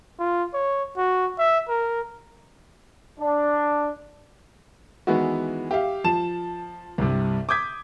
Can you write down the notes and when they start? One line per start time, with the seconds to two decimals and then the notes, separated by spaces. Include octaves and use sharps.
0.19 F4
0.54 C#5
0.97 F#4
1.39 E5
1.69 A#4
3.20 D4
5.07 D#3 E3 G#3 B3 E4 F#4
5.71 G4 E5 F5
6.04 F3 A5 E7
6.98 C2 G2 C3
7.49 D6 D#6 G6 G#6 B6